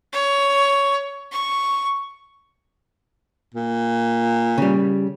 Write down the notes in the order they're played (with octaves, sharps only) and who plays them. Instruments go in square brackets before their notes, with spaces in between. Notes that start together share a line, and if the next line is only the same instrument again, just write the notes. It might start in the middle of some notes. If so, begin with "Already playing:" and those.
[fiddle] C#5
C#6
[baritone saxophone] A#2
[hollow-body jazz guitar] C#3 G3